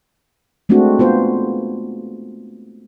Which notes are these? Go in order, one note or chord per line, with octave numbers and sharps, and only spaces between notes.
G#3 A3 C4 D4 F#4
B3 F4 C5